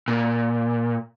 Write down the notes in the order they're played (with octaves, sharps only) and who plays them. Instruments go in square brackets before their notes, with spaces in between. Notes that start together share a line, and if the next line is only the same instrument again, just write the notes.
[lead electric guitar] A#2